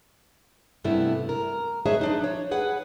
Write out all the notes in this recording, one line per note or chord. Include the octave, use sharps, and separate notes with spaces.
G2 C3 A3 B3 E4
A#4
G#4 B4 C#5 D#5 E5 A5
F3 D4 D#4
C#5
G#4 B4 F#5